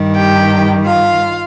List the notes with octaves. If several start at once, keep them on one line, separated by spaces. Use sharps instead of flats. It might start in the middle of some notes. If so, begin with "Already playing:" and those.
Already playing: G2 D#3 G3
G4 G5
F4 F5